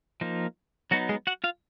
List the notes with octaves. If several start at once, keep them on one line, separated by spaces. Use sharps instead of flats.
F3 A#3 D#4
F#3 B3 D#4 F#4
G#3 G#4
F#4 F#5
F4 F5